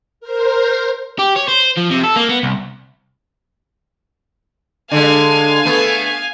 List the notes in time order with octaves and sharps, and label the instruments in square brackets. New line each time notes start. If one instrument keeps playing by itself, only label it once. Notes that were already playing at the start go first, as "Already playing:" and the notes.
[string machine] A#4 C5
[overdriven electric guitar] G4
C#5
C5
F3
C3
A4
A#3
B3
C2
[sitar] D3 G#3 [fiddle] F5 G#5
[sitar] A3 B3